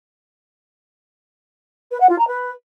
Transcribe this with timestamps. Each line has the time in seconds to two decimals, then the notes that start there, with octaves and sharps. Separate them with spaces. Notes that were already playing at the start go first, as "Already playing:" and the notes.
1.91 B4
2.00 F#5
2.09 F4
2.18 A#5
2.27 B4